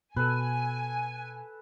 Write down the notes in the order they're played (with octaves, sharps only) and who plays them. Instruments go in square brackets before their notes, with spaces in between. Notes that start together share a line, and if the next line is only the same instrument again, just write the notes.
[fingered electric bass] B2 [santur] A4 B4 [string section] G#5